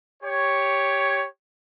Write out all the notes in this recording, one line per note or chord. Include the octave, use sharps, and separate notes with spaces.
G4 C#5